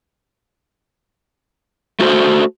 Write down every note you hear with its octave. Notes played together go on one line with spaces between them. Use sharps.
A3 F#4 C5